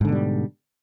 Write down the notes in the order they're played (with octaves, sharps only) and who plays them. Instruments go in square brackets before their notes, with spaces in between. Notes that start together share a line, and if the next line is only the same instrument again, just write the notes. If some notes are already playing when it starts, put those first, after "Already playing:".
[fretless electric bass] G#2
D3
B2
G3